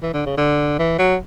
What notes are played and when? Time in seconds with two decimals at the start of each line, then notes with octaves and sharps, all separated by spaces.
0.02 E3
0.13 D3
0.26 C#3
0.37 D3
0.79 E3
0.98 F#3